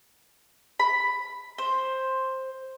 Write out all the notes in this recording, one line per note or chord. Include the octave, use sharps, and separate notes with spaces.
B5
C5